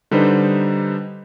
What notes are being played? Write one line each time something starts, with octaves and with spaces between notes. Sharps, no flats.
D3 G3 D#4 B4 C5